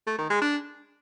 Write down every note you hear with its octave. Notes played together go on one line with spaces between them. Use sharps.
A3
D#3
G#3
D4